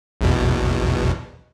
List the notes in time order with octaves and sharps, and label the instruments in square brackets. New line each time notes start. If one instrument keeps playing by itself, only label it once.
[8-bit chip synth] A#1 E2 B2